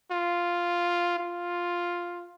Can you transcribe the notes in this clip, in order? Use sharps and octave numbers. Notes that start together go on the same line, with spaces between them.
F4
F4